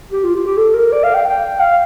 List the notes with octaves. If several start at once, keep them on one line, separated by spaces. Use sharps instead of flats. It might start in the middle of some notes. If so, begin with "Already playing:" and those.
G4
F4
G4
G4
A4
A#4
D5
F5
G5
G5
F5